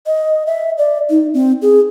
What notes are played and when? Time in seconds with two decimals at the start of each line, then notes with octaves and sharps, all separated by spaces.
0.07 D#5
0.46 E5
0.78 D5
1.10 D#4
1.34 C4
1.62 G#4